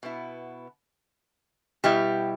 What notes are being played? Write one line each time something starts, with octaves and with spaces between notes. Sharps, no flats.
B2 B3 E4
B2 G3 B3 E4 G4